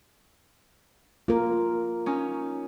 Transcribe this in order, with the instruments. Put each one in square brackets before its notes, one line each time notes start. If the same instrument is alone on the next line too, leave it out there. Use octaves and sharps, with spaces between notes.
[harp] A#3 [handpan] F4 A#4
[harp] C#4 D#4